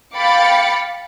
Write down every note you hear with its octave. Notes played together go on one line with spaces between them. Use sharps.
F5 G5 B5 D6 A6 C#7